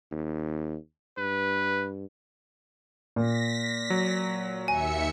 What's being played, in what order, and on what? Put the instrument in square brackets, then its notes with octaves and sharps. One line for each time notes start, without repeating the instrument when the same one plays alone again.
[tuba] D#2
[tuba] G2 [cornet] B4
[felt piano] A#2 [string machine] A#6 B6
[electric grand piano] F#3
[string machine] D#2 E5 C#7 [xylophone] G#5